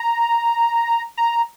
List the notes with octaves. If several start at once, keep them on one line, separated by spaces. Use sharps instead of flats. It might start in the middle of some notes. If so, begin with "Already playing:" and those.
Already playing: A#5
A#5